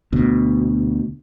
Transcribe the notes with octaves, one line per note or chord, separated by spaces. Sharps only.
D2 B2